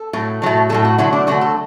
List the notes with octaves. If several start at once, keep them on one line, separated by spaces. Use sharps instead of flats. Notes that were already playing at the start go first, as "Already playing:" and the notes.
Already playing: A4
A2 F#3 A3
A2 F#3 A3
A2 F#3 A3 A4
F#4
D3 F#3 A3 E4
D4
D3 F#3 A3 F#4
A4